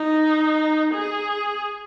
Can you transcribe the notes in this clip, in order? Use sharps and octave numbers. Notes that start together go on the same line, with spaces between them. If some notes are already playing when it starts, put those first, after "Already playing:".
Already playing: D#4
G#4